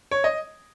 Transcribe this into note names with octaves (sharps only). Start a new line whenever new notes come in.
C#5
D#5